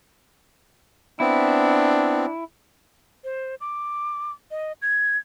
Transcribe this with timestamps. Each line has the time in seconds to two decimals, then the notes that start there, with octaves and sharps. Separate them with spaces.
1.20 B3 C4 D4 E4
3.24 C5
3.61 D6
4.51 D#5
4.82 G#6